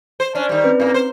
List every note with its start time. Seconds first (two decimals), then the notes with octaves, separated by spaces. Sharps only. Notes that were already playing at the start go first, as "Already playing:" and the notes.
0.20 C5
0.35 C#4 D4
0.49 D#3 G3 D5
0.64 C4 C#4 B4
0.80 A2 A#3
0.94 C5